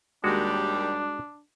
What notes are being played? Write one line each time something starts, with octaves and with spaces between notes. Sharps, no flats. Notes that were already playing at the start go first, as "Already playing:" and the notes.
D#2 G3 G#3 D4 F#4